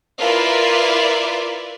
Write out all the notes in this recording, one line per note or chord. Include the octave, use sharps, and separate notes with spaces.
E4 F4 A#4 B4 D5